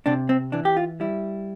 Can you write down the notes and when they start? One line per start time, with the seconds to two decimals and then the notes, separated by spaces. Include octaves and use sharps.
0.06 C3 D4
0.29 C4
0.52 E3 D4
0.65 G4
0.77 F4
1.00 G3 E4